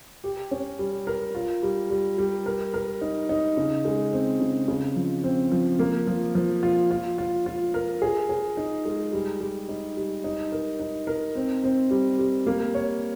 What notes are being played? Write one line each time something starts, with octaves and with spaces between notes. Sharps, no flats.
G4
C#4
G3
A#4
F4
G3
G3
G3
A#4
A#4
D#4
D#4
C#3
G#3
C4
C#3
C#3
F3
C4
F3
A#3
F3
F3
F4
F4
F4
F4
A#4
G#4
G#4
D#4
G#3
G3
G3
D#4
G3
D#4
A#4
D#4
A#4
C4
C4
G3
G3
A#3
C#5